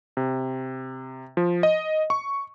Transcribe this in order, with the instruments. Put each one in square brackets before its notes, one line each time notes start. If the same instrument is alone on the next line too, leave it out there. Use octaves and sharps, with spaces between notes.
[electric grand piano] C3
F3
D#5
C#6